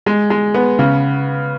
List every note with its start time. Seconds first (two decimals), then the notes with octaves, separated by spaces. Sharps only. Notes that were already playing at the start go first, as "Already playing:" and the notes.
0.06 G#3
0.30 G#3
0.54 B3
0.79 C#3